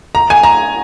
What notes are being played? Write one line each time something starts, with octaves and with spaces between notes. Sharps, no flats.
A#5
G#5
A#5